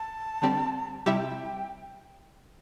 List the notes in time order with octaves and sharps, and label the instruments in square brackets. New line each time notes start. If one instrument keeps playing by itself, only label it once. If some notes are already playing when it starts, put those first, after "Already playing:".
Already playing: [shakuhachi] A5
[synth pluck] D3 G3 C4 G4 D5
[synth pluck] C3 G3 E4 G4 E5 [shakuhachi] G5